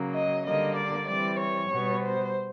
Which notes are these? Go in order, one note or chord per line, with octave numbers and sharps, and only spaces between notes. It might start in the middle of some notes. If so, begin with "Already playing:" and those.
Already playing: C#3 F#3 A#3
D#5
D3 G3 A#3 D#5
D5
E3 G3 C4 D5
C#5
B2 G3 B3
C5